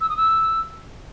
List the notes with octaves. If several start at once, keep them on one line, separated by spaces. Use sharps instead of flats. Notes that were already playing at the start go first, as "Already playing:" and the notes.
E6
D#6
E6